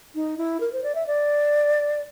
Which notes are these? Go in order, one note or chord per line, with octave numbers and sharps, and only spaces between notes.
D#4
E4
A#4
C5
D5
E5
D5